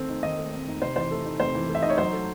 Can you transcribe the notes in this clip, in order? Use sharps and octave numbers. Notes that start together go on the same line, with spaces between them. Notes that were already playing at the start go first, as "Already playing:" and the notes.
Already playing: D#3 A3 C4
D#4
D#3 D#5
A3
C4
D#4
C3 C5
E3 C5
A3
D#4
C3 C5
E3
A3
E5
D#4 D#5
C#5
F#3 C5
A3